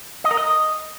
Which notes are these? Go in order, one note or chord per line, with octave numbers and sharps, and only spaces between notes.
D#5
A#4
D#5